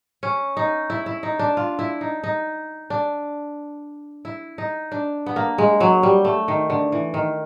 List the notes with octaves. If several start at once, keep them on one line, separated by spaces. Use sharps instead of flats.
C#4
D#4
E4
E4
D#4
D4
F4
E4
D#4
D#4
D4
E4
D#4
D4
B3
A#3
G#3
F#3
G3
A3
D#3
D3
E3
D#3